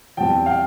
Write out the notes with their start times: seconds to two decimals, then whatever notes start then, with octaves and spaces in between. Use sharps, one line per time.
0.17 E2 B2 G3 C4 G5 A5
0.46 F5 G5